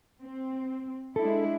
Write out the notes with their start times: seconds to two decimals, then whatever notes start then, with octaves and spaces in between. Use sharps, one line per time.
0.21 C4
1.16 G#3 D4 E4 A4